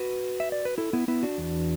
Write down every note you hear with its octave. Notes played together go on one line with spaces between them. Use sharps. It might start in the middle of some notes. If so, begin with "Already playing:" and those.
Already playing: F#4 B4
E5
D5
B4
E4 A4
B3 E4
B3 E4
D4 F#4
E2 E3